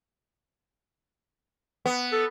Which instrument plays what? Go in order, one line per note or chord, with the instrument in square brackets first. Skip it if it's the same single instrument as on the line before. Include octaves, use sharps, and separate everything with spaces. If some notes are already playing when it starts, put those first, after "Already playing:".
[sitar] B3
[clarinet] A4